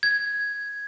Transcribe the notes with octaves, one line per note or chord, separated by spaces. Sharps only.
G#6